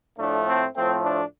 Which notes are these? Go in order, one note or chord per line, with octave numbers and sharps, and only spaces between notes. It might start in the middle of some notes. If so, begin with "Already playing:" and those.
A2 F3 A3 D4
C4
A2 F3 A3 C4
D4